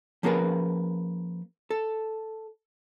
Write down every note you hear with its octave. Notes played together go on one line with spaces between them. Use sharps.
F3 A#3 C#4 G#4 A#4 B4
A4